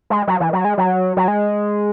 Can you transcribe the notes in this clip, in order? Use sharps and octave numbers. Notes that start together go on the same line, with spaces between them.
G#3
F#3
E3
F#3
G#3
F#3
F#3
G#3